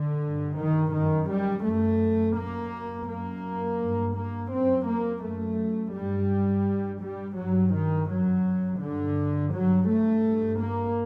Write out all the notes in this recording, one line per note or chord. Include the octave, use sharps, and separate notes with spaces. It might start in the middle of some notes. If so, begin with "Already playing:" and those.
Already playing: D3
G2
D#3
F#2 D#3
G3
F#2 A3
F#2 A#3
F#2 A#3
G2
A#3
F#2 C4
A#3
F#2 A3
G2 G3
G2
G3
G2 F#3
D#3
F#2 F#3
G2 D3
G2 F#3
A3
G2
A#3